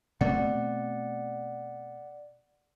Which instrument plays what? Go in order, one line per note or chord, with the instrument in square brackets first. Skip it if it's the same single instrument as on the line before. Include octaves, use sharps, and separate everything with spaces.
[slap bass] B2 A3 C4 [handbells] D5 F#5